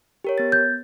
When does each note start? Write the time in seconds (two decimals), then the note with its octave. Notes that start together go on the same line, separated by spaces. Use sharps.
0.24 G4 A#4 C#5
0.38 B3 A6
0.52 G6